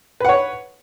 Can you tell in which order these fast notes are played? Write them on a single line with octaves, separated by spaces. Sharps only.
B4 F#5 C#5